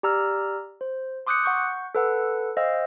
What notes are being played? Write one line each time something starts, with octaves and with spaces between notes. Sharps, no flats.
G4 D5 A#5 E6 F6
C5
C6 D6 D#6 F#6 G6 C#7
F#5 C#6 G6
A4 B4 F#5 E6
C5 D#5 F5 G5 E6